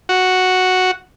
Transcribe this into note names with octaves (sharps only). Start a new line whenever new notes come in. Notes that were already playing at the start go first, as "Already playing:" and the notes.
F#4